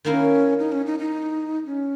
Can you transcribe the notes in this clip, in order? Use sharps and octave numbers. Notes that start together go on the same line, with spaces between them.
D#3 A#3 C#4 D#4 E4 A#4
D#4
C#4
D#4
D#4
C#4